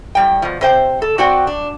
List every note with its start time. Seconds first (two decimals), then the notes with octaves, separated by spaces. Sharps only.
0.15 A2 G3 G5
0.42 B2 F3
0.61 C3 C5 G5
1.02 A4
1.18 C4 F#4 D5 G5
1.47 D4